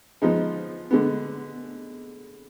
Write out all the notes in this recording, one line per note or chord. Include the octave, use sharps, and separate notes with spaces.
F3 G#3 B3 D#4
D3 G#3 B3